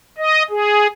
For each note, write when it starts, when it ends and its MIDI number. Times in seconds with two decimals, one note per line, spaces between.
0.18 0.43 75
0.50 0.87 68